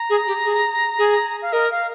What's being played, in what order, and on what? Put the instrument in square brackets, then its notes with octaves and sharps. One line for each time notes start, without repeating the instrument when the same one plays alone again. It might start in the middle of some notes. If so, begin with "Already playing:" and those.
Already playing: [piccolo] A#5
[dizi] G#4
G4
G#4
G#4
[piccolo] F5
[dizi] A#4 [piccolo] D#5
[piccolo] F5